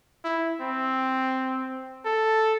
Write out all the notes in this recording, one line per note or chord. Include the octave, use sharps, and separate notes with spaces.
E4
C4
A4